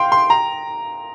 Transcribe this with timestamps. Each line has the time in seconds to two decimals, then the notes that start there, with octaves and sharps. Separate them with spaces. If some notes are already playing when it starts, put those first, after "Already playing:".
Already playing: F5 G5 C6
0.12 C6
0.30 A#5